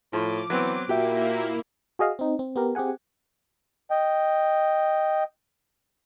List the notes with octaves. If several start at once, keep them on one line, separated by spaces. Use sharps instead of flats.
A2 F3 D6
E3 F#3 B3 C4
A#2 A#3 E4 F#4 G4 E5
F#4 G#4 D#5 F5
C4 D#4
C4
B3 G4 A#4
C4 G4 G#4 F#5 G#5
D#5 G5